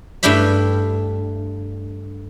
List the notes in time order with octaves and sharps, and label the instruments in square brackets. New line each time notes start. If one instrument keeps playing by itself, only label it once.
[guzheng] G2 A3 D4 E4 G4 E5